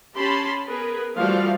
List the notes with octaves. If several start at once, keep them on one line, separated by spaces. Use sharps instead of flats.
C#4 G4 A5 B5 C6
B3 G#4 A#4 B4
E3 F3 G3 A3 F#4 F5